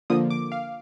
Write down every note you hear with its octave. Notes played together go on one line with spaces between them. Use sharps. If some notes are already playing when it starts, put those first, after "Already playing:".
D3 F3 A#3 D#6
D6
F5